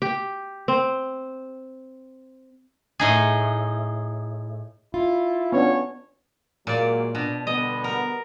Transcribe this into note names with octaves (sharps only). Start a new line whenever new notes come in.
G4
C4
A2 D#4 G#4
E4 F4
B3 C#4 D4 C#5
A#2 F#3 G#3 A#3 D5
B2 D4
D3 G3 B3 D#5
A#4